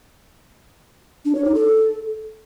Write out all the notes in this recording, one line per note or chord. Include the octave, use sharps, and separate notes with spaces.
D4
C#5
D#4
A4